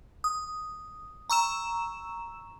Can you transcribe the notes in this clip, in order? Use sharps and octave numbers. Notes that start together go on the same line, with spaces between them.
D#6
A#5 C#6 E6 E7